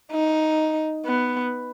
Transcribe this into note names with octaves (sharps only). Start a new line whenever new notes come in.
D#4
B3